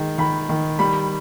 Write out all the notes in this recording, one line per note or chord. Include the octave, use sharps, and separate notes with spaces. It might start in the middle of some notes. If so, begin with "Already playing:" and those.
Already playing: D#3 G#3
D#3 B5
D#3
G3 B5